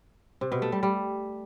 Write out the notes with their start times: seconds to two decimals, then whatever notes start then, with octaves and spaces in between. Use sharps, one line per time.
0.41 C3
0.52 B2
0.62 A3
0.72 G3
0.83 G3